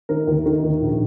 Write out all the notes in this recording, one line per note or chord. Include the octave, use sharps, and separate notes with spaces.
D#3 A#4
D#2
D#3
D#2
A#1